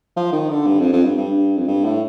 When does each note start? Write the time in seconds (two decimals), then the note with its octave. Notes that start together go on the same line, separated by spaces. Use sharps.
0.16 F3
0.33 D#3
0.50 D3
0.66 G2
0.80 F2
0.92 F2
1.05 G2
1.17 G2
1.57 F2
1.68 G2
1.84 A2